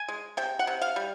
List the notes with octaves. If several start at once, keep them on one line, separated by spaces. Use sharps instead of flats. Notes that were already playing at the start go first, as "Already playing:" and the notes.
Already playing: G#5
G#3
C3 G5
F#5
C3
F5
G3